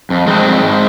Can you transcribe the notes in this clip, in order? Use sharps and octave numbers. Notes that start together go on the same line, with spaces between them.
F2
F2 G#3 C4
F2
G#2